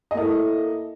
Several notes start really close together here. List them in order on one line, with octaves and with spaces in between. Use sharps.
D#5 A#3 E4 A4